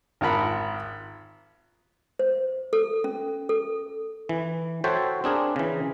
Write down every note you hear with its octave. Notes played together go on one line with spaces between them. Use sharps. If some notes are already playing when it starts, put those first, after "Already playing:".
G#1 F4 A#4 F#5 A#5 B5
C5
A4
C#4
A4
E3
F#4 A4 C5 C#5 E5 G5
C4 D4 G#4 A#4
C#3 E3